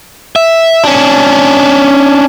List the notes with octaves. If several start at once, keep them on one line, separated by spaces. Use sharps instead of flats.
E5
C#4 D4